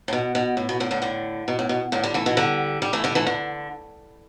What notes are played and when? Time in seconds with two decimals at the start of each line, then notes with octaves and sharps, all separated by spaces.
0.08 A2
0.13 B2
0.35 B2
0.57 A2
0.69 B2
0.80 A2 D3
0.91 A2 D3
1.02 A2 D3
1.48 B2
1.59 A2
1.69 B2
1.92 A2 D3
2.04 D3 G3
2.14 E3 A3
2.26 B2 E3
2.37 D3 G3
2.82 G3
2.93 E3 A3
3.04 D3 G3
3.15 E3 A3
3.27 D3